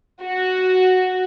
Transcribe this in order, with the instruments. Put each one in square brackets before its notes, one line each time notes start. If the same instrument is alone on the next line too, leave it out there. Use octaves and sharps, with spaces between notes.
[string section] F#4